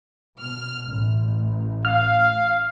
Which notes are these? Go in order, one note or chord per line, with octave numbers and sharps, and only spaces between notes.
B2 F6
A1
F5 F6